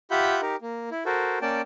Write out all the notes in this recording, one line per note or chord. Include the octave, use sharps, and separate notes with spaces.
F4 G4 E5 F#5 B5 G6
D#4 G4 A#4
A#3
E4
F#4 A4 A#4 C5
A#3 C#4 D5 G5 A5